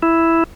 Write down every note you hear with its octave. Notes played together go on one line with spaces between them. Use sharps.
E4